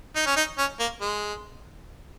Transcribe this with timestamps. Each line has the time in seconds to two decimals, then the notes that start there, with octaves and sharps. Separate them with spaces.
0.16 D#4
0.27 C#4
0.37 D#4
0.58 C#4
0.80 A#3
1.01 G#3